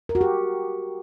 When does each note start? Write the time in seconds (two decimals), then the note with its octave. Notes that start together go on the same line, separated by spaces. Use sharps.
0.09 A#4
0.15 F#4
0.21 G4